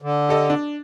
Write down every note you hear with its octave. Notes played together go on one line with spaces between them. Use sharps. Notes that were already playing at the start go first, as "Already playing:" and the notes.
D3
G4 A4 D#5
D4